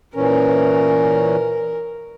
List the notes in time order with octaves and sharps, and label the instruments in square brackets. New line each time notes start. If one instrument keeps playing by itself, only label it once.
[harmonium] A#2 E3 C#4 [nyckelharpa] A#4